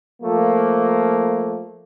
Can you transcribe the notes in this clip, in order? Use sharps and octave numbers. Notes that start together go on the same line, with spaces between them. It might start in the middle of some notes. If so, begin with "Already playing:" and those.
F3 A3 A#3